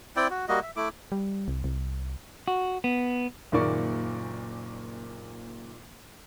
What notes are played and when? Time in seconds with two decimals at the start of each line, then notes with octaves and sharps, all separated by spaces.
0.16 C4 E4 D5 G5
0.30 F#4
0.48 G3 A#3 F#4 D#5
0.63 E5
0.76 A3 E4 D6
1.12 G3
1.48 C2
1.64 C2
2.48 F#4
2.84 B3
3.52 F#1 A#2 D#3 A#3 D5 C#6